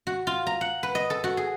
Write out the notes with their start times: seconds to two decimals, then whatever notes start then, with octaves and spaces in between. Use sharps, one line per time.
0.07 F#4
0.27 F4
0.47 A#5
0.61 F#5
0.83 B4
0.95 D#5
1.10 A4
1.24 F#4
1.37 G#4